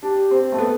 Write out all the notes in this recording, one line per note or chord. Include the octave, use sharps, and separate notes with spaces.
D4 G4
C4
A3
B3 A4